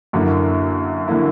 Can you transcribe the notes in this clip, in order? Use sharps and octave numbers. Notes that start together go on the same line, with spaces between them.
F#2 D3 A#3 E4
D3 A#3 E4